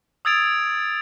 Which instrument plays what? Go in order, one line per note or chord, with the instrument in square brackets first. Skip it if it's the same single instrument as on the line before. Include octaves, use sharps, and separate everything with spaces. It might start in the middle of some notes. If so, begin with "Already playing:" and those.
[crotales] D#6 E6 G#6 A6 D7 F7